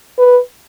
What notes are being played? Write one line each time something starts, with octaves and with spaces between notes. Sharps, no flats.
B4